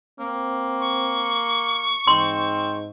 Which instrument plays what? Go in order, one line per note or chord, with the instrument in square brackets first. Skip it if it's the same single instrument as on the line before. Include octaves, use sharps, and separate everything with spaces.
[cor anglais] A#3 [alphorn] C4
[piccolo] C#6
[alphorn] G#2 [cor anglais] C4 [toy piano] C6